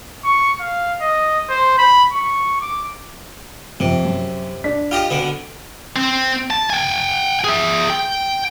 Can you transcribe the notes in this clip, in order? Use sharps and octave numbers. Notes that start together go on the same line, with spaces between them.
C#6
F5
D#5
C5
B5
C#6
D6
F2 C3
F#2
D4 D5 B6
F4 G4 D#5 F6
B2 D3 B3
C4
A5
G5 G#5
G#4 E5
G5